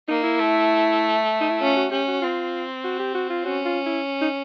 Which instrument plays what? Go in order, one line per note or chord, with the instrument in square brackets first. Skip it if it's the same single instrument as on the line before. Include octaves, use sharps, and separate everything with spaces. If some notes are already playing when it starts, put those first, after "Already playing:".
[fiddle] A#3 [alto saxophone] D#4
[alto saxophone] E4
[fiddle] A3
[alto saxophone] D#4
E4
[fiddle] C#4 [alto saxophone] F4
[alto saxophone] F#4
[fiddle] C#4 [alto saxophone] G4
[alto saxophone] F#4
[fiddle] C4 [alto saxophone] F4
[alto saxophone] F#4
G4
F#4
F4
[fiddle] C#4 [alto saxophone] F#4
[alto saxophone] F4
E4
D#4